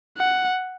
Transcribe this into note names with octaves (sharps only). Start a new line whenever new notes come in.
F#5